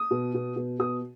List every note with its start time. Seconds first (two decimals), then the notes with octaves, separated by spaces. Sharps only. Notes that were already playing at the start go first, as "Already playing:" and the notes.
Already playing: D#6
0.11 B2
0.34 B2
0.56 B2
0.79 B2 D#6